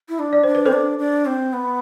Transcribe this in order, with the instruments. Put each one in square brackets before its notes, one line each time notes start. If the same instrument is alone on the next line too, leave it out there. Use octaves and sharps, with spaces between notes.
[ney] E4
D4
[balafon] D5
[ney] D4 [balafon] C5
[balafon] B4
[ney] C4 [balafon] A4 C5
[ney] D4
D4
C4
B3